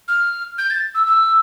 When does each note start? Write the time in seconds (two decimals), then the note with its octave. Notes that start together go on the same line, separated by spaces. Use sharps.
0.08 F6
0.58 G6
0.70 A6
0.95 E6
1.07 E6